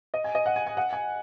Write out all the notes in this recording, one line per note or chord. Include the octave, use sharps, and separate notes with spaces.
D#5
G#5
D#5
F#5
G#5
G#5
F#5
G#5